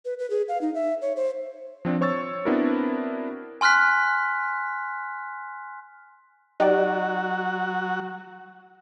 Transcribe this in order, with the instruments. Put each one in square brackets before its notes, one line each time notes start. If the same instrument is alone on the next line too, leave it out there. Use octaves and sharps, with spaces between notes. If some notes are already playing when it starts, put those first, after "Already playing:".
[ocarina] B4
B4
G#4
F5
D#4
E5
C#5
C5
[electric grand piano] F3 C4 D4
C5 C#5 C#6 E6 A6
B3 C4 D4 E4 F#4 A#4
[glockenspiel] G#5 C6 F6 F#6 B6
[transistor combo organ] F#3 F#4 [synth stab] D#4 G4 D5